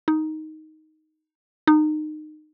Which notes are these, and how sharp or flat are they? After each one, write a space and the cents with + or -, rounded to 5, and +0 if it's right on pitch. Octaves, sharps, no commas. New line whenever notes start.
D#4 +5
D#4 -25